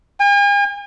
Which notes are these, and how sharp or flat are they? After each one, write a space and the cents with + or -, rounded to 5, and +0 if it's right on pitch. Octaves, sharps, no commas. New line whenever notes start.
G#5 -45